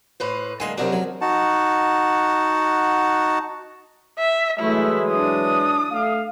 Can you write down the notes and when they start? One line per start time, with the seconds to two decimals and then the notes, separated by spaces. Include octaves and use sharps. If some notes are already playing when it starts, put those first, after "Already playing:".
0.20 A2 B4 C5
0.60 D3 G#3 A#3 G#5 C6
0.78 F#2 C3 D4 F#4 G#4 A#4
0.93 F#3
1.21 D#4 F#4 F#5 A5
4.19 E5
4.59 E3 F#3 G#3 A3 E4
5.11 D4 D#6
5.91 A3 F5